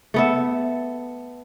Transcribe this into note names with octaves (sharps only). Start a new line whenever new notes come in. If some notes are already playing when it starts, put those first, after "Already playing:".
A3 B3 E5